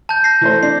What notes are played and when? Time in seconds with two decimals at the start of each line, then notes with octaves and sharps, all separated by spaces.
0.09 A5 G6
0.24 A#6 C7
0.41 E3 A3 C5
0.63 D4 C7